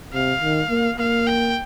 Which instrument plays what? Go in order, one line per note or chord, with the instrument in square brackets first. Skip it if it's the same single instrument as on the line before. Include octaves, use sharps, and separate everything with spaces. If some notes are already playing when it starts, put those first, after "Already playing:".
[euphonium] C3 [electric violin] F5
[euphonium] D#3
A#3
[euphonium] A#3 [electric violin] F5
[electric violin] G5